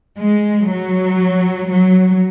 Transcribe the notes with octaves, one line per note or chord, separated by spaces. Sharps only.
G#3
F#3
F#3